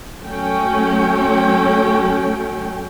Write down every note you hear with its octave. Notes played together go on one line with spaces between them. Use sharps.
F#3 A3 C#4 G5